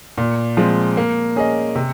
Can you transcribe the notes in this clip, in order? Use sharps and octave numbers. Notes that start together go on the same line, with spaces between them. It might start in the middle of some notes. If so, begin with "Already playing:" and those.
A#2
F3 G#3 C4
A#3
C#4 G#4 D#5
C3